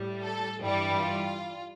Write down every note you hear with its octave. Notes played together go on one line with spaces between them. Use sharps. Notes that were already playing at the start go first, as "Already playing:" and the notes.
Already playing: A2 G3
A4
G2 E3 G3
F4